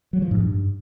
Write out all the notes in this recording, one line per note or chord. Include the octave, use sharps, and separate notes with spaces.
F#3
F3
G#2
G2